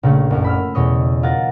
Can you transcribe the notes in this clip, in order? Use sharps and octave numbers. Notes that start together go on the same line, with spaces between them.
A#1 C#3 A3 A4
F#1 F#2
B5 E6 F6
E2 B2 C#5 D#5
F4 A#4 F#5 A6